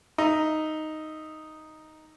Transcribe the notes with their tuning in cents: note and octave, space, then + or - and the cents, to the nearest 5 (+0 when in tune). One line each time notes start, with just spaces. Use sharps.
D#4 +0 E5 +15